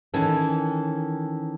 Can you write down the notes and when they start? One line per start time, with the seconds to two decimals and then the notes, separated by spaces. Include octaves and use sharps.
0.14 D#3 E3 C#4 A4